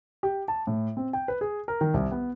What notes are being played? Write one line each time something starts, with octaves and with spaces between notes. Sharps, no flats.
G4
A5
A2
C4
G5
B4
G#4
A#4
D#3
C2
B3